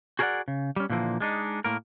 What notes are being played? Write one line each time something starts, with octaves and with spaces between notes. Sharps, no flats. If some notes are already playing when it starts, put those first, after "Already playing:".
F#4 G#4 A#4 B4 D5 F#5
C#3
G3 C#4
A#2 D3 E3 F3 A#3
G#3 D4 D#4
A2 A#3 A#4